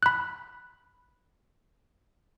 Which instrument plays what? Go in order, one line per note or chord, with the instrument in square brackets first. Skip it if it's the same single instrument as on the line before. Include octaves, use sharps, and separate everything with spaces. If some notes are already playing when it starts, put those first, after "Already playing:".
[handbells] B5 F#6